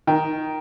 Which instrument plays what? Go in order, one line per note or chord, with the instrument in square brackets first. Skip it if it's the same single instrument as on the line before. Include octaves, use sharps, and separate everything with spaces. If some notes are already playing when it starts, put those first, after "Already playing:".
[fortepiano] D#3